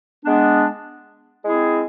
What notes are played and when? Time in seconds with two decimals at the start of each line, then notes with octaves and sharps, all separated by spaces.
0.24 G#3 B3 D4
1.42 G#3 C4 E4 G#4